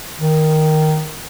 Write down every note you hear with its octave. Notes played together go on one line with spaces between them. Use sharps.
D#3